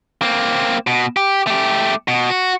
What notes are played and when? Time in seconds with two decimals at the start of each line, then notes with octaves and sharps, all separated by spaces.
0.22 A#3 C4
0.87 B2
1.17 G4
1.47 A3 G4
2.08 B2
2.30 F#4